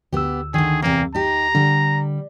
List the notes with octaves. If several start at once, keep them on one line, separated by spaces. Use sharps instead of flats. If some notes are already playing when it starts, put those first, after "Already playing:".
D2 B3 G4 E6
D3 D#3 G#4
E2 C3 A#3
D#4 G4 A#5
D3 G3